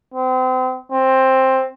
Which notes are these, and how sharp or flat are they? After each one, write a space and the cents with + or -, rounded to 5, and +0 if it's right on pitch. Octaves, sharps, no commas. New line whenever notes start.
C4 -35
C4 +10